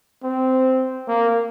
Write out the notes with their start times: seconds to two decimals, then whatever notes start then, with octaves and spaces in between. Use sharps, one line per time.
0.23 C4
1.08 A#3